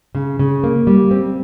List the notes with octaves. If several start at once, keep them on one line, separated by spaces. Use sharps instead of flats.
C#3
C#3
A#3
G3
C4